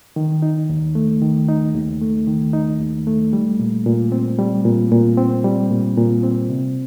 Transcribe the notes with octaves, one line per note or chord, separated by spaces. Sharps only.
D#3
D#4
D#2
A3
D#3
D#4
D#2
A3
D#3
D#4
D#2
A3
G3
A#2
A#2
C4
G3
A#2
A#2
C4
G3
A#2
A#2
C4
C3